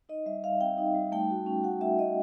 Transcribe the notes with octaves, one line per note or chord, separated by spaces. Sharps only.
D#4 D#5
G3 E5
G3 F5
C4 G5
D#4
G3
A3 G5
F#4
C#4
F#4 F#5
F#4 E5
A3 D#5